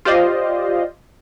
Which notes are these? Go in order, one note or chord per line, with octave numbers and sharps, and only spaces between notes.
F4 G4 C5 D5 D#5 F5